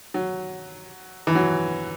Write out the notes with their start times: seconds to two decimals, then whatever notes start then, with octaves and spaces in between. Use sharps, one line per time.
0.14 F#3
1.27 E3
1.35 F#3